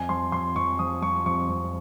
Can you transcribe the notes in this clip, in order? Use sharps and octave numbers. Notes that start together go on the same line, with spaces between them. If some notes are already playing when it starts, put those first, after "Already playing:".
Already playing: F2 G#5
F3 C6
F2 C6
F2 C#6
F3 D#6
F3 C#6
F2 C#6
F2